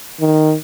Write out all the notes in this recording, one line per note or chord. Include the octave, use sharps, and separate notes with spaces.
D#3